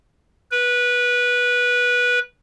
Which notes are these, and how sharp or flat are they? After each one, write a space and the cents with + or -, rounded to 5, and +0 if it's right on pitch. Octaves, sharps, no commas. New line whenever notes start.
B4 -15